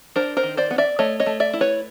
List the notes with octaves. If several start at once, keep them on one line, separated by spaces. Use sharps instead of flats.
D4 A#4 C5
A#4 C5
D#3
C5 D5
B3
D5 E5
A3 C#5 D#5
C#5 D#5
A3
D5 E5
E4
B4 C#5